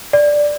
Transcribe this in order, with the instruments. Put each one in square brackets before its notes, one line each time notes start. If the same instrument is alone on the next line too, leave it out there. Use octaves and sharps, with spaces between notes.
[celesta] D5